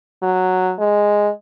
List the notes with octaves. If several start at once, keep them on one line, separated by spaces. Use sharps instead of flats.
F#3
G#3